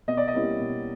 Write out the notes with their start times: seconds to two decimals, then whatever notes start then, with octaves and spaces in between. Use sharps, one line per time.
0.08 B2 D#5
0.17 D5
0.28 D#5
0.34 G3 A#3 C#4 E4
0.60 B2